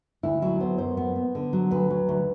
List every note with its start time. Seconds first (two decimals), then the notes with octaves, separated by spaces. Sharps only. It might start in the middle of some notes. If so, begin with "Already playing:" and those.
0.23 D2 E4
0.42 F#3 E4
0.60 B3 C5
0.78 F#2 C5
0.97 B3
1.16 B3
1.35 D3
1.53 F#3
1.71 D2 B4
1.90 F#3
2.09 D2